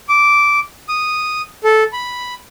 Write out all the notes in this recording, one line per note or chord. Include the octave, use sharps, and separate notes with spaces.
D6
D#6
A4
B5